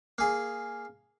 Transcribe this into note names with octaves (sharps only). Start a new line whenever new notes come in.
A#3 G#4